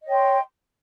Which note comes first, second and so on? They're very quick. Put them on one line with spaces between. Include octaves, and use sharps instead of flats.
D#5 C#5 G5 C6